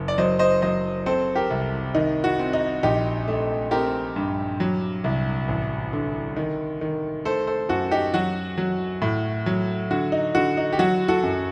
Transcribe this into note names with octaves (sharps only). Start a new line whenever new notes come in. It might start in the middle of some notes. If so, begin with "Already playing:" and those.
Already playing: F#1
D5
F#3 C5 D#5
C5 D#5
F#3 C5 D#5
C4 A4 C5
G4 A#4
C2
D#3 D#4
F#4
C4
D#4
A#1 D#4 G4
A3
C4 G4 A#4
G2
F#3
C2
A1
D3
D#3
D#3
A3 A4 C5
A4 C5
F#2 F#4 A4
D#4 G4
F#3 F#4
F#3
A2
F#3
D3 F#4
D#4
D3 F#4
D#4
G4
F#3 F#4
F#4 A4
F#2